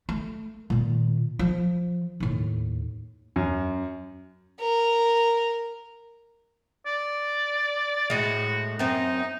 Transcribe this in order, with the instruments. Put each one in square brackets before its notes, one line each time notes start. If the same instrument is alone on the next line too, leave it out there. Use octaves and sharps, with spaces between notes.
[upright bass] A3
A#2 D#3
F3
D#2 A2
[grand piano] F#2
[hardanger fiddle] A#4
[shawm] D5
[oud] A2 G#3 [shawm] F#4
[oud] F#2 C4 [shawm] D#4